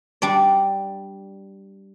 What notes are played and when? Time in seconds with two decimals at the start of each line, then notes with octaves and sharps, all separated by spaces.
0.22 G3 D4 D5